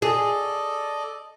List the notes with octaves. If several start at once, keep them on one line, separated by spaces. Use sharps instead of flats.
G#4 A4 D5 D#5